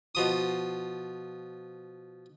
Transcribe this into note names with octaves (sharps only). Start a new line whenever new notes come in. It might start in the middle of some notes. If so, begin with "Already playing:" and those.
B2 F3 D#6